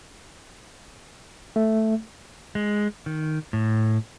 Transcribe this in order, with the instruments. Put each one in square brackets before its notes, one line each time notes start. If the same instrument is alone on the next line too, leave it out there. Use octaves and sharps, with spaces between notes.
[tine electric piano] A3
[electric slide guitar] G#3
D#3
A2